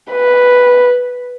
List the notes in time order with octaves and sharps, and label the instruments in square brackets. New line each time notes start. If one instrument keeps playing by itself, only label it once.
[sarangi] B4